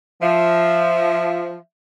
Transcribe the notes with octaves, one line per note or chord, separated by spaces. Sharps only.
F3 E5